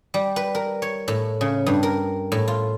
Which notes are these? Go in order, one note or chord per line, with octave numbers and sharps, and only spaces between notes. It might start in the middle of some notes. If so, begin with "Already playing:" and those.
G3
B4
A#4
C#5
A2
C#3
G2
A#4
A2
F4